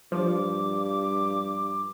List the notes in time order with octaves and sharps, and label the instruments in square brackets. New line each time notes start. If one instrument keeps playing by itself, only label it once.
[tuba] G2 [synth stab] F3 [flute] D6